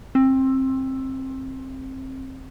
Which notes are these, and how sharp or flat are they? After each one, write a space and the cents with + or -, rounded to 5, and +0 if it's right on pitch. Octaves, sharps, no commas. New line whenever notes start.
C4 +20